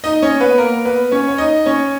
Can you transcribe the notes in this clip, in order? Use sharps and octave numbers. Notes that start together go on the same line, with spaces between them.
D#4 D#5
C#4 C#5
B3 B4
A#3 A#4
B3 B4
C#4 C#5
C#5
D#4 D#5
C#4 C#5